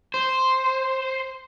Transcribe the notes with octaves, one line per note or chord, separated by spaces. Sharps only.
C5